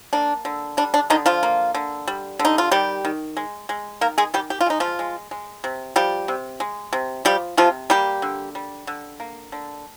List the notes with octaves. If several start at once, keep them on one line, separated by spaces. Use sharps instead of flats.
A#3 D4
D3
G3 D4
D4
D3 D#3 D#4
F3 F4
A#3
D3
G3
D3
D#4
F4
D#3 G3 G4
D#3
G#3
G#3
D#3 A#3 A#4
G#3 G#4
D#3 G3 G4
G4
F4
G#3 D#4
F3 F4
G#3
G#3
C3
F3 G3 G4
C3
G#3
C3
F3 G3 G4
C3 F3 F4
G3 A#3 G4
D3
G3
D3
A#3
D3